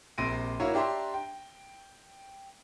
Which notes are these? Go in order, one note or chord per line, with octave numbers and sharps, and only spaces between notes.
A#1 C3 C6 A#6 D7 D#7
A#3 E4 F#4 C#5 A#5
D4 G4 E5 A#5 C6
G5